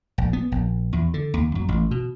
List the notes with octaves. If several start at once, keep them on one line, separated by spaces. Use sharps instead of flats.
A#1
B3
A#1
E2
D3
D#2
F#2
A1
B2